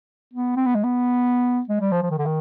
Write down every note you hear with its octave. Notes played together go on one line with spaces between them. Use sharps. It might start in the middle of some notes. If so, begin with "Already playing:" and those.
B3
C4
B3
G#3
B3
G#3
G3
F3
F3
D#3
D3
D#3